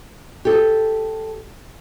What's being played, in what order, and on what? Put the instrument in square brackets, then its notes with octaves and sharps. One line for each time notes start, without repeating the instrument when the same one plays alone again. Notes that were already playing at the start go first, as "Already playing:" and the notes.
[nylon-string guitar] G4 A4